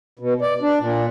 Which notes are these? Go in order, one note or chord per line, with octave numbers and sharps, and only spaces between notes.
B2
D5
D4
A#2